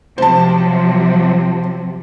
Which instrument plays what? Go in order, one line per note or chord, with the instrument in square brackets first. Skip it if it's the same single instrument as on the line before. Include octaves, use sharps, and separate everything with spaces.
[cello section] C3 F3 F#3 [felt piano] C5 A5